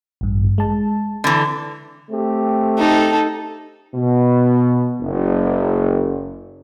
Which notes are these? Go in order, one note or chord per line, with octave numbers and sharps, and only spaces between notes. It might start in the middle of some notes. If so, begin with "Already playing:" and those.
A1 G2
G#3 A5
D3 E3
A3 C4 G4
D#4 A4
B2
F#1